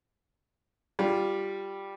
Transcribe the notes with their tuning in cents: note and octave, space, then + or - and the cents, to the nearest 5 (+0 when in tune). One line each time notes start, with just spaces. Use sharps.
G3 +0 F4 +0